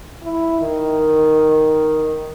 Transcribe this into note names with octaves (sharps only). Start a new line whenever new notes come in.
E4
D#3